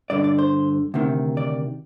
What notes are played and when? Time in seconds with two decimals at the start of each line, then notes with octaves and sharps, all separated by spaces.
0.10 G2 D3 D5
0.24 D5
0.39 C5
0.94 D2 C3 D#3
1.37 D5